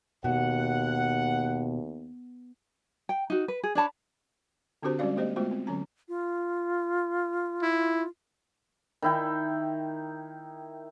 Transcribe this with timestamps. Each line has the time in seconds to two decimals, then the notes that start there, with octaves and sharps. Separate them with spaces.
0.24 D#2 B2 F#5
3.09 G5
3.30 D#4 F#4
3.48 B4
3.64 G#4
3.75 D4 C#5 A5 B5
4.83 D3 C4 D4 F#4 G4 C5
4.99 G3 G#3 C#4 F#4 D5 F5
5.16 A3 B3 G4 C5 D#5
5.36 G#3 A3 B3 F4 F#4 C5
5.51 C4
5.67 D3 F#3 C#4 A#5
6.09 F4
7.62 E4
9.02 D#3 E4 G5